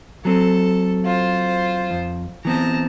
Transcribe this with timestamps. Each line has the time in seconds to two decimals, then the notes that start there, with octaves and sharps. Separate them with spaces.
0.25 F#3 C4 A4
1.05 F4 C5
1.91 F2
2.45 E3 B3 C4 A5 A#5